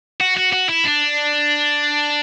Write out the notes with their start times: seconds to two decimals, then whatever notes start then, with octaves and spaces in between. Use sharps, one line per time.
0.21 F#4
0.37 F#4
0.53 F#4
0.69 E4
0.85 D4